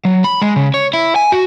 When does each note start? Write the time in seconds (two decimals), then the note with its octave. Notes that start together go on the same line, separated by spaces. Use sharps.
0.05 F#3
0.24 B5
0.42 G#3
0.56 C#3
0.74 C#5
0.94 E4
1.16 G#5
1.32 F#4